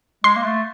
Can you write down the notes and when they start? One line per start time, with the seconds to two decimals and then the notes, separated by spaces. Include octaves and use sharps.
0.24 G#3 C6
0.36 A#3
0.45 A3